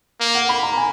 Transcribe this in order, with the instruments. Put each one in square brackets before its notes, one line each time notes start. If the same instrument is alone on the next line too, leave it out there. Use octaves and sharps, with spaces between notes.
[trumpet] A#3
[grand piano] F#5
B5
A#5
G#5